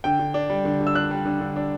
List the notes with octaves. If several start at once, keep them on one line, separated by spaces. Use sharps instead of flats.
D3 G5
D3
D4
G3
D3
D3
E6
D4 F#6
G3
D3
D3
D4